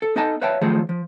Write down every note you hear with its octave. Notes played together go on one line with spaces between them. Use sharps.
A4
B3 D#4 A4 D#5 G#5 A5
B4 C#5 E5 F5 G5 A5
D#3 F3 F#3 A3 G#4 C5
F3